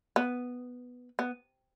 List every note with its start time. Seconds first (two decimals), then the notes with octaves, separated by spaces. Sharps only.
0.16 B3
1.19 B3